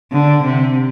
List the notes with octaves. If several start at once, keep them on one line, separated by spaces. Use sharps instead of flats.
D3
C3